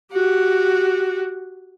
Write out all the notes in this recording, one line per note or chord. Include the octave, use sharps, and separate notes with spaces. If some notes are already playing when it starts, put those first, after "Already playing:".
F#4 G4